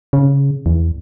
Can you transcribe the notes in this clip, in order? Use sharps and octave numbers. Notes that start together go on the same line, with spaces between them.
C#3
E2